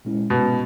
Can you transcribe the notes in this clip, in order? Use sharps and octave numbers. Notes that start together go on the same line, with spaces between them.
A#2 G#3 C#4 E4
B2